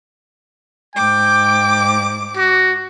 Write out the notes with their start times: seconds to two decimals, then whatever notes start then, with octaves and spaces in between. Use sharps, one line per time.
0.96 G#2 G5 D6
2.37 F#4